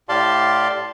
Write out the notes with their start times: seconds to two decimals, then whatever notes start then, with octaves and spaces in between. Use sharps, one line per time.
0.09 A2 G4 D5 F5 A5 C6